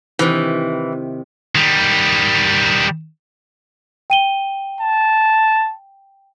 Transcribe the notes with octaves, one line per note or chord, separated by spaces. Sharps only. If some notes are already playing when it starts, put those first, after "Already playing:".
C3 D#3 E3
D#3 G3
G5 D#7 G7
A5